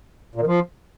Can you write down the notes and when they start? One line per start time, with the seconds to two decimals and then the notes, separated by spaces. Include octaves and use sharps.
0.35 A#2
0.41 D#3
0.47 F3